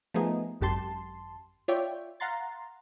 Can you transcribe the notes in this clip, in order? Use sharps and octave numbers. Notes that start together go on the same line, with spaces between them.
F3 A3 B3 D#4 G#4
G#1 F#2 G4 A5 C6
F4 C#5 D5 E5 G5
F5 F#5 A#5 C6 A6